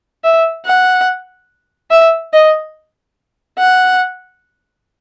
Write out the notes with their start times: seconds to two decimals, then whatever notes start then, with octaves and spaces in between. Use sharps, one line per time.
0.24 E5
0.66 F#5
1.91 E5
2.33 D#5
3.58 F#5